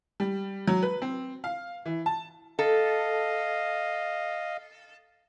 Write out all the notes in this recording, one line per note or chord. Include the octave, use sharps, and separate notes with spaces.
G3
F#3
B4
C4
F5
E3
A5
A4 D#5 F5